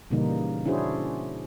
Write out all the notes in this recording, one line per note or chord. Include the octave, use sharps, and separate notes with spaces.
A#2 C#3 E3 G3 A#3 D#4
C#4 D4 E4 F#4 G#4 C5